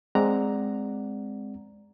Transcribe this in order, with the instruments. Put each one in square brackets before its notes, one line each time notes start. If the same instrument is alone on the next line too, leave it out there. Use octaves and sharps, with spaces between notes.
[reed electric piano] G#3 C4 D5 F#5 A#5